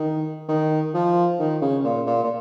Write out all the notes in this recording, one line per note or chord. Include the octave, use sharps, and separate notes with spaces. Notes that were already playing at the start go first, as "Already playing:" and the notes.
Already playing: D#3
D#3
F3
D#3
C#3
A#2
A#2
A#2